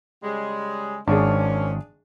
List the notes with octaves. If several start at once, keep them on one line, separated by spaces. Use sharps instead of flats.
C#3 G3 G#3
G#1 F3 A#3 C#4 D4 G#4